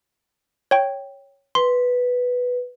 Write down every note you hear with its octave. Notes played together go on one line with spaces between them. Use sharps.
C#5 G5
B4 C6